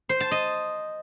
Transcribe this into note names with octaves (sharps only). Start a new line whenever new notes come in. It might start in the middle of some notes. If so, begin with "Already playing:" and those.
C5
A5
D#5